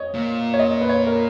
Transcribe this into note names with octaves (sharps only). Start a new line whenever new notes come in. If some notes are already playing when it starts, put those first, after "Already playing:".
Already playing: C#5 D#5
A#2
C#5
D#5
B4
C#5
A#4